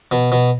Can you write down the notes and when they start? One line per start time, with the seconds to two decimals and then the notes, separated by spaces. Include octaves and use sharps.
0.12 B2
0.32 B2